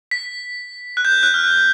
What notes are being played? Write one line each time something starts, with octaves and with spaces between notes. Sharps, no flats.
B6
F#6
G6
F#6
F6
F#6